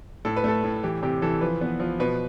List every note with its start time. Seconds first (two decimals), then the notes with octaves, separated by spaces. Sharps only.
0.25 A2 A4
0.36 B4
0.44 A3 A4
0.64 A2
0.83 E3 G4
1.03 C3 G4
1.22 E3 A4
1.41 F3 B4
1.61 B3
1.80 F3
2.00 B2 B4